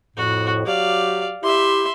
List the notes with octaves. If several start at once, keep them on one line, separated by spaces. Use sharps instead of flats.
F2 A2 F#4
F#3 G4 D5 F5
E4 G4 E5 C6